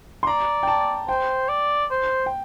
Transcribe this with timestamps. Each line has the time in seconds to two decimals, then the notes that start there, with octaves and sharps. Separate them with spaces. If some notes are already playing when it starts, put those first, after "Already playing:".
0.23 C6
0.27 D5 A#5
0.63 G5
0.67 A5
1.09 C5 G5
1.49 D5
1.91 C5
2.26 G5